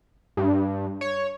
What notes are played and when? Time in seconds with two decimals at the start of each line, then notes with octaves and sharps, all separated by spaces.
0.37 G2
1.01 C#5